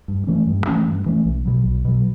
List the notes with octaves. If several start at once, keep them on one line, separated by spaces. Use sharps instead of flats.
G2
E3 A3 C#4
G2
E3 A3 C#4
G2
E3 A3 C#4
B1
B2 F#3
B1
B2 F#3